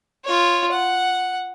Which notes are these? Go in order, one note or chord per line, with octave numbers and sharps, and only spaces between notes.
F4 C#5
F#5